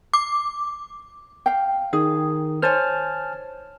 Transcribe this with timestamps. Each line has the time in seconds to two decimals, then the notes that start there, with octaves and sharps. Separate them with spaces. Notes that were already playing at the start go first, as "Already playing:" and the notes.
0.14 D6
1.46 F5 G5
1.93 D#3 G#4
2.62 C5 C#5 G#5 A5 F6